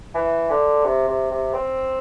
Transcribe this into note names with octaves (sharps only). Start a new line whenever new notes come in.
E3
D3
C3
C3
C3
C4